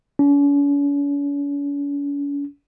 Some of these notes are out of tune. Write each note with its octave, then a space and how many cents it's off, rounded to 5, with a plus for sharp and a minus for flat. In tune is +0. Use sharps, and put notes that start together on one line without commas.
C#4 +45